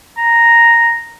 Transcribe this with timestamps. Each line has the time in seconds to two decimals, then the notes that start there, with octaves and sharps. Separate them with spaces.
0.17 A#5